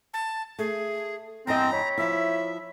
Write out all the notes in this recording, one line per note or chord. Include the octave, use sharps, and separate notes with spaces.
A5
A3 G#4
E2 G2 C4 D#5 A#5
C#5 B5
F3 E4 E5